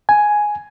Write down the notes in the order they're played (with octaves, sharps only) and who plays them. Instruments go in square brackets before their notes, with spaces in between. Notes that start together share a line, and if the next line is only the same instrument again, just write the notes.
[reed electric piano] G#5